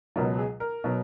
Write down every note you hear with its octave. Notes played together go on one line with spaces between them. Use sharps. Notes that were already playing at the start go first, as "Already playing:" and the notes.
C#2 B2 F#3 A#4
G#4
A#4
B2 F#3